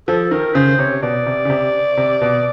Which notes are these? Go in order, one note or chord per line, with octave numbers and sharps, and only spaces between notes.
F3 A4
D#3 A#4
C#3 C5
C3 C#5
B2 D5
C3
C#3
C3
C3
B2